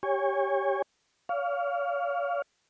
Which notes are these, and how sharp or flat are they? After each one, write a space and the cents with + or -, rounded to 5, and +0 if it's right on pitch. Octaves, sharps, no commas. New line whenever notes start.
G4 +0 C#5 +0 G#5 -40
C#5 +40 F5 +0